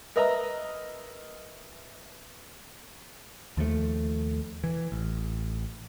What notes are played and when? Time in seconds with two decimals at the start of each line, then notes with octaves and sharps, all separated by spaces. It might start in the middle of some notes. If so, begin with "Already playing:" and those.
0.16 A#4 B4 D#5 E5 A#5
3.57 D#2 F3 F#3 A3
4.64 E3
4.92 A1